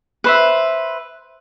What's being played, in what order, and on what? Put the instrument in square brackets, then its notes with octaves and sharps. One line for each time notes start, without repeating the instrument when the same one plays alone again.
[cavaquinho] B4 C5 E5